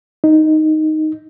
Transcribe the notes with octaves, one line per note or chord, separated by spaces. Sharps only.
D#4